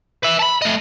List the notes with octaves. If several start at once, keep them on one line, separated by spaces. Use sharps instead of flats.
B4 E5
A5 B5
A3 D#5